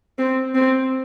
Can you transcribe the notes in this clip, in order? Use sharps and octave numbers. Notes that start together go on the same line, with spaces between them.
C4
C4